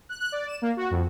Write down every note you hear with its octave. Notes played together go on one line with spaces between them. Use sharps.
F#6
F#6
D5
E7
A#3
F#4
F2